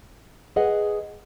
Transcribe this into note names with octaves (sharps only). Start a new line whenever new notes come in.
G#4 B4 D#5 F#5